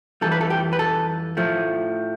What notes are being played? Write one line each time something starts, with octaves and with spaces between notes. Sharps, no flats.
F2 E3 G3 A4
B4
A4
G4
B4
A4
A2 F3 A3